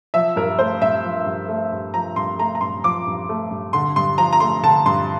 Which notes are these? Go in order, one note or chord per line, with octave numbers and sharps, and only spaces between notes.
F3 E5
G2 A#4
A3 C5
G2 E5
F3
G2
A3
G2
F3 A#5
G2 C6
A3 A#5
A#5
G2 C6
F3 D6
G2
A3
G2
D3 C6
G2 C6
F3 A#5
A#5
A3 C6
D3 A5
G2 C6